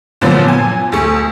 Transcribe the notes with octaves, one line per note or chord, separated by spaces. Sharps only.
A#2 D3 F3 F#3 B3
G#5
D2 A3